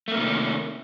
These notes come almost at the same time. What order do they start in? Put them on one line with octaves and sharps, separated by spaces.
A3 A#3 C3 D#3